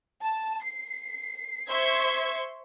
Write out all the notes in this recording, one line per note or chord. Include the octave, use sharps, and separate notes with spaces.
A5
C7
C5 E5 C6 C#6 G#6